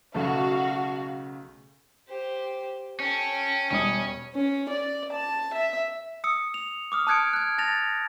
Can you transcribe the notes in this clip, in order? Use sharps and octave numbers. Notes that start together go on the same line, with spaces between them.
B1 C#3 A3 F#4 F5
G4 C5
C#4 A4 G5
E1 G3 C#4 D#6
C#4
D5
A5
E5
D#6 E6 C#7
F7
D6 D#6 F6
A5 D#6 F#6 G#6 C#7 D7
F#6 G#6
A5 A6 A#6 F7